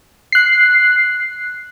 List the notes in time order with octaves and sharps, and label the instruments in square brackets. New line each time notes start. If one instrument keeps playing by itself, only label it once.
[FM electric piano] F#6 C7